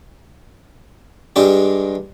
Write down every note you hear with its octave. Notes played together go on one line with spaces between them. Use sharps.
G2 G#3 D4 G4